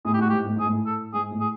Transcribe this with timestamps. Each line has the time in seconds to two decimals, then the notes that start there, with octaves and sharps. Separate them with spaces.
0.05 A2 G#4
0.14 G4
0.19 A2 F#4
0.30 G#2 G4
0.45 A2
0.56 G#2 G#4
0.66 A2
0.86 A4
1.13 G#2 G#4
1.31 A2
1.41 G#4